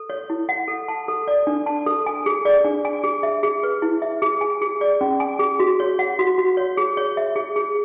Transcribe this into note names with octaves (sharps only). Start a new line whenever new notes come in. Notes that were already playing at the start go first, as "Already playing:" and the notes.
Already playing: A4
C#5
E4
F#5
A4
A5
A4
D5
D4
A5
A4
G#5
G#4
D5
D4
G#5
G#4
E5
G#4
B4
E4
E5
G#4
G#5
G#4
D5
C#4
G#5
G#4
F#4
C#5
F#5
F#4
F#4
C#5
G#4
C#5
E5
G#4
G#4